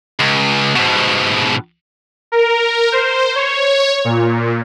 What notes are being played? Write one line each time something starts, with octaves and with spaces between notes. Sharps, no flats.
C#2
G#2 B2
A#4
C5
C#5
A#2